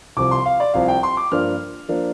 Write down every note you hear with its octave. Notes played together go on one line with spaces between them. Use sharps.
C2 C3 F3 D6
C6
F5
D5
C2 C3 F3 F5
G5
C6
D6
G2 F3 A#3 D4 F6
F3 A#3 D4